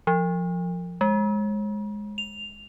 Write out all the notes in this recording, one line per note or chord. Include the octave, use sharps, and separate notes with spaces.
F3
G#3
F7